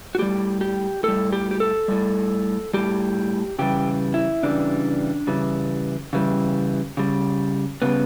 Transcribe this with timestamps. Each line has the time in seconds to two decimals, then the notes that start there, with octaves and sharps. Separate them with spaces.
0.15 F#4
0.19 A2 G3 G4
0.61 G4
1.03 A2 G3 A4
1.33 G4
1.51 G4
1.60 A4
1.88 A2 G3
2.73 A2 G3 G4
3.59 C#3 E3 G3 G4
4.14 E4
4.43 C#3 E3 G3 D4
5.27 C#3 E3 G3
6.13 C#3 E3 G3
6.97 C#3 G3
7.82 C#3 G3 B3